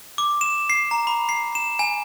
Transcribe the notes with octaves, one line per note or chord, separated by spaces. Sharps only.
D6
E7
C7
A#5
B5
C7
E7
G#5